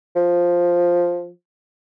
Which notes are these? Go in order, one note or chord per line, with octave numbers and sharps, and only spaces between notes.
F3